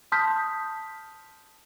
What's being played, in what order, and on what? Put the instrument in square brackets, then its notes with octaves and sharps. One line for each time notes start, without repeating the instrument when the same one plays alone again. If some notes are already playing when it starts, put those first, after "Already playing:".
[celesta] A5 C6 D#6 F6 G6 B6